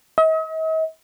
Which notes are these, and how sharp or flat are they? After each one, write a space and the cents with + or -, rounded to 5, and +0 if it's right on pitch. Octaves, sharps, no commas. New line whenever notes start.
D#5 +45